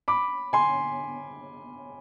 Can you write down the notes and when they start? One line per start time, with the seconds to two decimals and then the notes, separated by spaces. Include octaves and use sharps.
0.08 B5 D6
0.53 G#5 C6